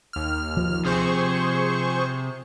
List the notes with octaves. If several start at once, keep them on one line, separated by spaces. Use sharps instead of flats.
D#2 F6
F3
C3 G#4 C5 C#6